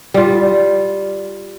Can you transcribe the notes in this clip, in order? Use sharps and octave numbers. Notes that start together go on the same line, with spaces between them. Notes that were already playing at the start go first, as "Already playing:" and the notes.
G3 F4